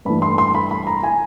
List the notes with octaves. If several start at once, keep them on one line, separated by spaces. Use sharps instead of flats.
G2 E3 A3 B5
C6
C6
B5
B5
A#5
G#5